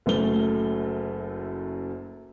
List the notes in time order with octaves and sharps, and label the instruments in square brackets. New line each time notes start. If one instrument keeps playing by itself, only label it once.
[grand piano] F#1 F#2 A3 G7